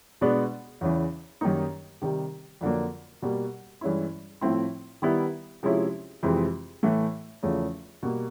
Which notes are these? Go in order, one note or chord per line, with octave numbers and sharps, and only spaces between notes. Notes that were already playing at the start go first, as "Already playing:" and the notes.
B2 G#3 B3 D4
E2 C#3 E3
F#2 D#3 G3 A#3 D#4
C3 D#3 G3
F2 D3 F#3 A#3
B2 G3 A#3
G2 E3 G#3 C#4 E4
A2 F3 A3 C4 E4
D#3 G3 B3 E4
C3 F3 G#3 C#4 E4
F2 C3 E3 G#3 C4
A2 E3 A3
E2 C#3 F3 A3
B2 G3 A#3